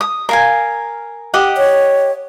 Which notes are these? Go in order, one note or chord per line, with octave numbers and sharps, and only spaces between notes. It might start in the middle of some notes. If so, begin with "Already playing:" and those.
D#6
A#4 F5 G#5
G4 D#5 F#5
C#5